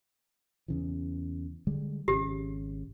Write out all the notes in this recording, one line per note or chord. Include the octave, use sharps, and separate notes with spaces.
E2 C#3 E3
D3 G3 G#3
G#1 C#3 G4